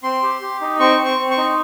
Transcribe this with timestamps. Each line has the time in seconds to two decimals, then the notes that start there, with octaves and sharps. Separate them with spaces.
0.03 C4 C6
0.23 G4
0.41 G4
0.61 D#4
0.80 C4 C#6
0.99 C4
1.05 C#6
1.18 C4
1.31 C#6
1.37 D#4